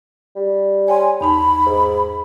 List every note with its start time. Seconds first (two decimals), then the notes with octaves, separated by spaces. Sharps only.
0.36 G3
0.88 C#5 G5 G#5 C6
1.21 E2 D#4 A5 B5
1.66 G#2